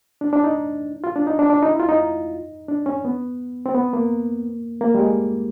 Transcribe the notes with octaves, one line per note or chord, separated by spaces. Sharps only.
D4
D4
D#4
F4
D4
D#4
D4
D4
D#4
E4
F4
D#4
D4
C#4
B3
C4
B3
A#3
A#3
G3
G#3